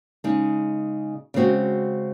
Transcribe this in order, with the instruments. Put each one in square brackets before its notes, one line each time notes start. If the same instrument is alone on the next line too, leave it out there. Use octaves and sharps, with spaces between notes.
[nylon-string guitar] C#3 G#3 D#4
C#3 G#3 C4 F#4